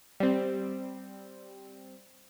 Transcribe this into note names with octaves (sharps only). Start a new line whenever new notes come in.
G3 C4